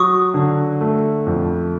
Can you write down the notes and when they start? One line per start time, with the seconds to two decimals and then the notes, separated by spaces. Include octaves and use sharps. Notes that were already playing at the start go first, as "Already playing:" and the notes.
Already playing: F#3 C#6 D#6
0.34 D3
0.81 A3
1.27 F2